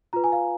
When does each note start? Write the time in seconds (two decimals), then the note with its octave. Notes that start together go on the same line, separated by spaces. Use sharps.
0.13 F4 B4 A#5
0.24 G#5
0.32 F5